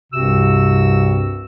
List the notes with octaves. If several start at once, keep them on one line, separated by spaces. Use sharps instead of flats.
C2 G2 C3 C4 F#4 E6